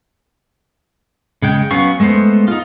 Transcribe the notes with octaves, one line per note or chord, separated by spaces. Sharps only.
C#3 G#3 G5
F#3 B3 C#4 F5 C#6
G#3 A3 B3 C5
D#4 F4